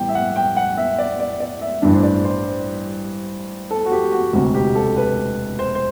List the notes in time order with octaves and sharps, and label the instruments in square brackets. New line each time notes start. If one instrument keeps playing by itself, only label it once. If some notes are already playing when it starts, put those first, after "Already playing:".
Already playing: [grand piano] A1 A2 G3 B3 G5
E5
F#5
G5
F#5
E5
D5
D5
D5
E5
A1 G2 E3 G3 D4
C5
D5
C5
A4
F#4
G4
F#4
E1 D2 C3 F#4
G4
A4
B4
C5
C5